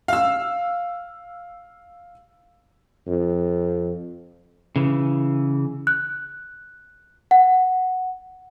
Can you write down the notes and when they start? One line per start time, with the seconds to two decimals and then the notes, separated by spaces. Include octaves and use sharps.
0.08 F5 E6
3.07 F2
4.76 C#3 E3
5.87 F#6
7.31 F#5